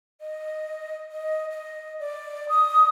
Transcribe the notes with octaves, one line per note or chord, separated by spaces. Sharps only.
D#5
D#5
D#5
D5
D#6